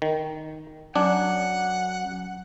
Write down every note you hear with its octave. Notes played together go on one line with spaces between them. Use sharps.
D#3
F#2 D4 F#5